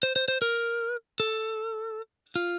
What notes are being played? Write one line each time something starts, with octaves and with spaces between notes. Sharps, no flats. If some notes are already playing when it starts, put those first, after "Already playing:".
C5
C5
C5
A#4
A4
F4